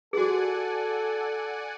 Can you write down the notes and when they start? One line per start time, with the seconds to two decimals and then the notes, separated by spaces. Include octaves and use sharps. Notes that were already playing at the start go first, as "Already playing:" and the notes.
0.13 F#4 G#4 A4 D5 F#5 G#5